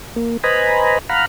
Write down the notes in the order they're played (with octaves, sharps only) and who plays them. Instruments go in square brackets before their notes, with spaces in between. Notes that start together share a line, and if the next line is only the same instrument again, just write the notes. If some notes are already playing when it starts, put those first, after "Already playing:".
[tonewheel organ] A#3
B4 C5 D#5 G#5 A#5 B5
F5 F#5 A#5 B5 F6